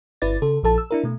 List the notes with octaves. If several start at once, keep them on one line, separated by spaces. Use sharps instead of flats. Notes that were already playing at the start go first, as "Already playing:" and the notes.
G1 E4 B4 D5 A6
C#3 A4
A#1 F3 A4 A5
E6
D4 E4 A#4
B2 A3